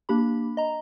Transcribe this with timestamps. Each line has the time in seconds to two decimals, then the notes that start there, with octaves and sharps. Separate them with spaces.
0.09 A#3 D4 G4 B5
0.57 D#5 A#5